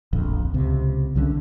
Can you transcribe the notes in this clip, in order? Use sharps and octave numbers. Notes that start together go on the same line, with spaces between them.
D1 A#1 F2
C#2 C3
C2 D3 F3 C#4